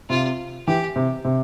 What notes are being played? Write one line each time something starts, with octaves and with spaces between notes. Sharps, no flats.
C3 F4
E3 G4
C3
C3